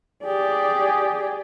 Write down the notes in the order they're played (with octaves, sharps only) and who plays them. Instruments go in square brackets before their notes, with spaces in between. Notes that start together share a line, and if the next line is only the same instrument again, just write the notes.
[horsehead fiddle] G4 D5 [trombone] G#4